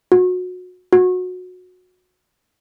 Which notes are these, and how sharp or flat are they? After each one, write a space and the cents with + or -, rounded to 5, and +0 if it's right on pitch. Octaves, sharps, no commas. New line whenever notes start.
F#4 -25
F#4 -20